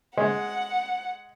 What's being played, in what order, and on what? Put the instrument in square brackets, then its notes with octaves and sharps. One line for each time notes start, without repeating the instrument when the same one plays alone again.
[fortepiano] G#3 [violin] F#5